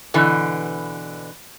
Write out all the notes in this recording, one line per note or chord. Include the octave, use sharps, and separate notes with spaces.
B2 D3 E3